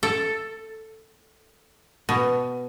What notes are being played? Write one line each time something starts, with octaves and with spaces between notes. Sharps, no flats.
A4
B2